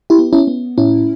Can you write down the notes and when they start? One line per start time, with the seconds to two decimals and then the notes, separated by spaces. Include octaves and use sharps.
0.10 E4 G4
0.18 B3
0.33 C#4 E4
0.47 B3
0.78 A2 C#4 E4